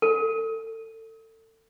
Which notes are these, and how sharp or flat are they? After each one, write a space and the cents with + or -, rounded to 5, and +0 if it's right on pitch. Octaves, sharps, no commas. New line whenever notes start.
A4 +30